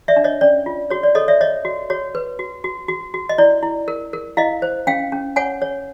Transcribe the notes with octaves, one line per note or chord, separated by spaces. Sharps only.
D5 E5
D4
C#5 D#5
C#4 D5
F4
F#4 C#5
D5
A4 C#5 D#5
D5 E5
C#5 D#5
F#4
F#4 C#5
B4
F#4
F#4
F#4
F#4
D#5
E4 D5
E4
A#4
A#4
E4 D#5 F5
C5
C#4 F5 G5
C#4
C#5 F#5 G#5
C#5